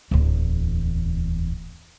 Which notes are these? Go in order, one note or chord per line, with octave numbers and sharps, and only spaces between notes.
D1 E2